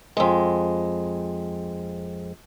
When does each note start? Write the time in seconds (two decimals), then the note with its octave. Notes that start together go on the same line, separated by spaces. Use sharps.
0.17 F2 G#3